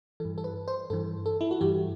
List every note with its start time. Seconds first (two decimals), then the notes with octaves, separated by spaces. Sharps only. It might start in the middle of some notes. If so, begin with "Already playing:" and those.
0.20 G2 E3 A4
0.38 A4
0.44 B4
0.68 C5
0.90 G2 E3 A4
1.26 A4
1.41 E4
1.51 F#4
1.61 G2 E3 G4